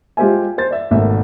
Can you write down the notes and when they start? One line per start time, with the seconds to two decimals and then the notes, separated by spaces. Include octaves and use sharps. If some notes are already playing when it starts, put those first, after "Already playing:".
0.17 G#3 F4 G4 C5 E5 G#5
0.58 C5 A6
0.71 D5 E5
0.91 G#1 B2 A3 A#3 E5